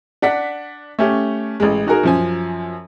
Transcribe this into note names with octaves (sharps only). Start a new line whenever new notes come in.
D4 F#5 B6
A3 C#4 G4
A1 G#3
D#4 F#4 G#4 A#4
F#2 F3 G#5